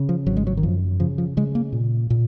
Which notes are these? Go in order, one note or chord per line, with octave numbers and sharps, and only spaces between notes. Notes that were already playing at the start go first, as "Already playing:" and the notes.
Already playing: C#3
F3
G#1 F#3
G#3
F#3
D#3
F#2 F3
C#3 F3
F3
C#3 G#3
A#3
A#2
A#2